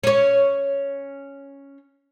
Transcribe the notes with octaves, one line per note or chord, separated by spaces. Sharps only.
C#4 C#5